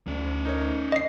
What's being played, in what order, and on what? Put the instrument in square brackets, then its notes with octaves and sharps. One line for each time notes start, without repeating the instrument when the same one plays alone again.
[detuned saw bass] D2 [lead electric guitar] C#4 D5
[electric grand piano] D#4 A#4 C#5
[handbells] D#5 C7